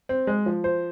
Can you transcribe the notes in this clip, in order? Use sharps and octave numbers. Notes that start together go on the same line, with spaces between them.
C4
G#3
F3
C5